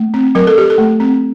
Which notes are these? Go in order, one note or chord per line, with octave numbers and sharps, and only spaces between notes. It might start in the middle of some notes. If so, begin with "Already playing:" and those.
Already playing: A3
C4
F#3 A#4
A4
F#3 G4
A4
A3
C4